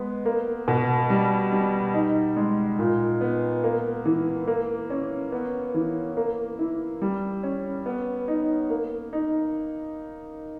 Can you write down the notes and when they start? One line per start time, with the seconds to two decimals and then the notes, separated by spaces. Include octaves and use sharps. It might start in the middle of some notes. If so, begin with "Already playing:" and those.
Already playing: G#3 B3
0.25 A#3
0.68 B2
1.10 G3
1.52 G3
1.94 D#4
2.37 G#3
2.79 A#2
3.21 B3
3.64 A#3
4.06 E3
4.48 A#3
4.90 C#4
5.32 B3
5.74 E3
6.17 A#3
6.59 E4
7.02 G3
7.43 C#4
7.86 B3
8.28 D#4
8.70 A#3
9.13 D#4